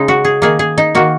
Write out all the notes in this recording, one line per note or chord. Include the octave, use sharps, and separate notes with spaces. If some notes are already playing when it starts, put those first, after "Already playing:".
Already playing: C#3 G#3 D#4
F#4
G#4
D#3 A#3 G#4
G#4
D#4
D#3 A#3 F#4